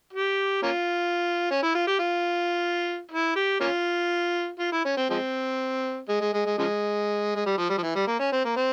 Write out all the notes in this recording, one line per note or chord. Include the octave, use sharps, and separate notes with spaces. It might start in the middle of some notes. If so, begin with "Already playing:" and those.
G4
A#3 C#4 F4
C#4
E4
F4
G4
F4
E4
G4
A#3 C#4 F4
F4
E4
C#4
C4
F3 G#3 C4
G#3
G#3
G#3
G#3
C#3 F3 G#3
G#3
G3
F3
G3
F3
E3
G3
A#3
C#4
C4
A#3
C4